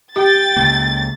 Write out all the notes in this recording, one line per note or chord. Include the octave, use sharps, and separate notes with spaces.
G4 G5 A6
C#2 C#3 A#3